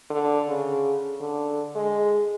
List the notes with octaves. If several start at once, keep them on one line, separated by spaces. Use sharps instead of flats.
D3
C#3
D3
G#3